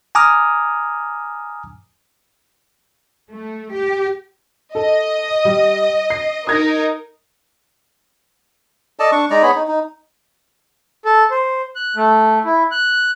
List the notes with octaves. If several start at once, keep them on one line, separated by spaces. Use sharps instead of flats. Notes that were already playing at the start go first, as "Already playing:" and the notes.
G#5 A#5 D6 D#6 F6
A3
G4
A4 D#5
G3
C7
D#4 A#4 D#6 G#6 A#6
A4 D5 D#5 A5
D4 C#6
G#3 D#4 D5 A#5
B3 G#4 C#5 B5
D#4
D#4
A4
C5
F#6
A3
E4
F#6